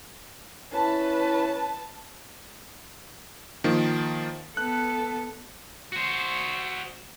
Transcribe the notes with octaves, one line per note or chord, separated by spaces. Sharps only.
C#4 E4 B4 A5
D#3 F3 A#3
B3 A4 F#6
F#4 C5